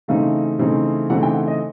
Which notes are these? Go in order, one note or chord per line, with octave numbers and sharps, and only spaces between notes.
C#3 E3 A3 C4 D#4 F5
C#3 E3 A3 C4 D#4
C#3 E3 A3 C4 D#4 F#5
G5
F#5
D#5